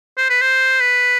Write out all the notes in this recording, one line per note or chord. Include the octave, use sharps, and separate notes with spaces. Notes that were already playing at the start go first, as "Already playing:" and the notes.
C5
B4
C5
B4